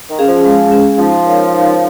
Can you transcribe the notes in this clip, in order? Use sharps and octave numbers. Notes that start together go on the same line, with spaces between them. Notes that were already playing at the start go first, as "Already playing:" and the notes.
D#3
C#4 G#4 F5
F3
G#3
C#4 G#4 F5
F3 D#4
A#4 C#5 F5
D#4